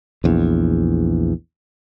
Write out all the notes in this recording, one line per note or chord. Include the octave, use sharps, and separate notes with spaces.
A#1 E2